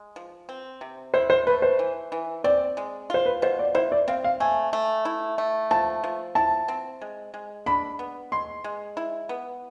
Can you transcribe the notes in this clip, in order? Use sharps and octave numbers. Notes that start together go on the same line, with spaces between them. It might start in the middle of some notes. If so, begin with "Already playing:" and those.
Already playing: G#3
F3
C4
C3
E4 C5
C5
A3 B4
C5
E3
E3
C4 D5
G#3
F4 C5
B4
B2 C5
D5
E4 C5
D5
C4 F5
F5
A3 G#5
A3
E4
A3
F3 A5
F3
E4 A5
C4
G#3
G#3
D4 B5
B3
G#3 C6
G#3
E4
B3